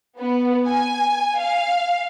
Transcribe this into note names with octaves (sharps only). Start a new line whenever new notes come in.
B3
G#5
F5